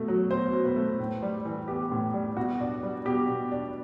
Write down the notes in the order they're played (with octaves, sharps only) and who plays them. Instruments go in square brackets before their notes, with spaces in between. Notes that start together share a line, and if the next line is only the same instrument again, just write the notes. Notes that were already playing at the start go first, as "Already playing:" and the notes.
Already playing: [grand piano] B2 A3
F#3
B2 C5
B2
B4
A3
A2
G3
E3
B3 G4
A2
G3
B2 F#4
D4
G3
B2 G4
B2
D4